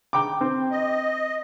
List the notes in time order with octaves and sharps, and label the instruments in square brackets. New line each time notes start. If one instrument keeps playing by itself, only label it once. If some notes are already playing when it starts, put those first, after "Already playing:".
[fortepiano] G5 A#5 D6
C4
[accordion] D#5